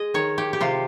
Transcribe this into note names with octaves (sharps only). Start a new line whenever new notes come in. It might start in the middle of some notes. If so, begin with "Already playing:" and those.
Already playing: G#3 D#5
D#3 C#5
G4
G4
C3 F4